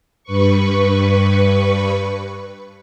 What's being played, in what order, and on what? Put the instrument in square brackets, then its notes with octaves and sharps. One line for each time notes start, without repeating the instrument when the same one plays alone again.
[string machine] G2 B4 C#6